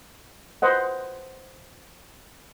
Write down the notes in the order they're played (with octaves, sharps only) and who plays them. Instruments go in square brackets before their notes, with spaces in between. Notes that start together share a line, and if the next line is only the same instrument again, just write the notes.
[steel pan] B4 C5 D#5 F#5